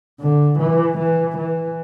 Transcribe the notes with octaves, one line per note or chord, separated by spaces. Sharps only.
D3
E3
E3
E3